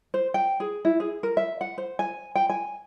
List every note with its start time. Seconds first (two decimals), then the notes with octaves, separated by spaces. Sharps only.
0.14 C5
0.34 G5
0.60 G#4
0.85 E4
1.00 G#4
1.23 A#4
1.37 E5
1.61 F#5
1.78 C5
1.99 G#5
2.35 G5
2.50 G#5